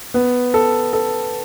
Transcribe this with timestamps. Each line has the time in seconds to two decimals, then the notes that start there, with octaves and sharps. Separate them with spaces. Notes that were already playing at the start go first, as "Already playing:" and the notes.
0.14 B3
0.54 A4
0.93 A4